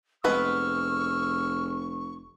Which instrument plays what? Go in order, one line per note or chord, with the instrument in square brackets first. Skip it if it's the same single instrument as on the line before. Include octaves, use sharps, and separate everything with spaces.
[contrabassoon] F1 [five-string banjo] G#3 B3 B4 [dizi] C#6 [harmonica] E6 F6